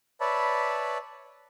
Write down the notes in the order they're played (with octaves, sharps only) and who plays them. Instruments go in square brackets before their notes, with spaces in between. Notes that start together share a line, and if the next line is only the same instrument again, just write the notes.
[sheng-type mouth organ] B4 C#5 D5 E5 A5 B5